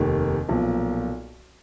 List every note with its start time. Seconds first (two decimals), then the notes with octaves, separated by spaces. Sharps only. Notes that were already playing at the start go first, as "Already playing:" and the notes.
Already playing: F1 D#2 D#3
0.49 B1 A#2 F3